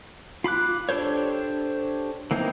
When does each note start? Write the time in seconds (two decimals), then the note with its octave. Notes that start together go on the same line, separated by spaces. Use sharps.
0.44 F4 B5 D6 F#6
0.89 D4 G4 A4 C5 C#5
2.31 E3 A#3 C4 D#4 E4